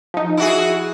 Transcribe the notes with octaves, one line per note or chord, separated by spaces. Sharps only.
F3 D#4
E4 F#4 G#4